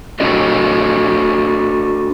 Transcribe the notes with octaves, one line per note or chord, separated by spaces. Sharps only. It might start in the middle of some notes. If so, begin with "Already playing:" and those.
D4 F#4 A4 D#5